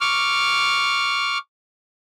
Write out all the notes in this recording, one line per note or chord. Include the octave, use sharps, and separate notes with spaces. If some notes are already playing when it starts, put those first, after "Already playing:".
C#6 D6 F6